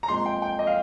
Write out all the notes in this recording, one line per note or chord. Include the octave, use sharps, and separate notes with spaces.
A#5
A#2 G#3 C4 C6
G5
G5
D#5
F5